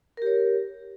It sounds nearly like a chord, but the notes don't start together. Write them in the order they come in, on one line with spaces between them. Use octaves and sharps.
A#4 G4 C#5